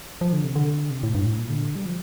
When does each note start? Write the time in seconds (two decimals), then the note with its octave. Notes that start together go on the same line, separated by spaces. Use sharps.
0.21 F3
0.33 D3
0.44 C3
0.56 D3
0.90 C3
1.03 A2
1.15 G2
1.26 A2
1.38 A#2
1.50 D3
1.75 G3
1.86 F3